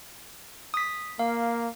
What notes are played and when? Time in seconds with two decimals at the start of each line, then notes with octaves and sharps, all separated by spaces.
0.74 D#6 B6
1.19 A#3 F5